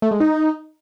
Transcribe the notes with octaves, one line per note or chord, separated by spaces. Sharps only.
A3
G#3
D#4